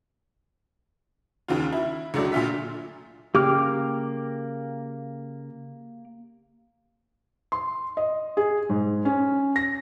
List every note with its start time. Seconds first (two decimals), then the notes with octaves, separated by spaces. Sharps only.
1.48 D#2 C#3 F4
1.72 E4
2.14 C#2 D3 F#3 A3 D5
2.32 A#2 D3 F4 E5 B6
3.35 C#3 A#3 G4 D6 F6
7.52 C6
7.97 D#5
8.37 G#4
8.69 G#2
9.05 C#4
9.56 A#6